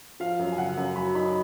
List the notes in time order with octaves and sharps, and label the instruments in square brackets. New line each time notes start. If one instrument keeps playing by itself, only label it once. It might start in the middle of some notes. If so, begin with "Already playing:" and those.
[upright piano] F3 F5
F#2
G#5
C#3 F#5
F#2
F#3 B5
D#4 B5